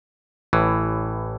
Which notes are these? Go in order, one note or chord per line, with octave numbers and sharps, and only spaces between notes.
A1 A2 E3